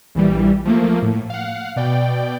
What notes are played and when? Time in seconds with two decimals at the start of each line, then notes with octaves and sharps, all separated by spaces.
0.15 A#1 E3 G3
0.65 F3 A3 A#3
1.02 A2
1.30 F5 F#5
1.76 B2 D5 G5